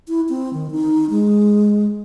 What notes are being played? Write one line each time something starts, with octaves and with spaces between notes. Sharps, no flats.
E4
C4
D#3
D#4
G#3